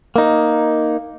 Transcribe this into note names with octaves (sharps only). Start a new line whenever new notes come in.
A#3 D#4